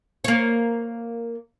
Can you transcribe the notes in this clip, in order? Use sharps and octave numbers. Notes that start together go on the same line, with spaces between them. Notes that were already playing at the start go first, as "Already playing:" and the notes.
A#3 C#5